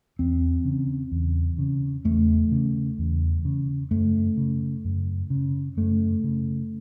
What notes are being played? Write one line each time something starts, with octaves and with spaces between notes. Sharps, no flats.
E2 C4
C#3
E2
C#3
E2 A3
C#3
E2
C#3
F#2 A3
C#3
F#2
C#3
F#2 A3
C#3